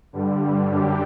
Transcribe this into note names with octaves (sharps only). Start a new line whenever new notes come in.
G2 D3 G3
F#2 D3 G3 D4 G4